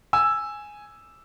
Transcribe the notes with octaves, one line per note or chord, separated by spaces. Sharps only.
G#5 E6